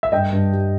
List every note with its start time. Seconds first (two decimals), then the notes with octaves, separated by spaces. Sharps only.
0.03 E5
0.12 G2 D#5 G5
0.32 G2
0.53 G3